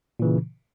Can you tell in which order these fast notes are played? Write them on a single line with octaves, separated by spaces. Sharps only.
A#2 E3 C#3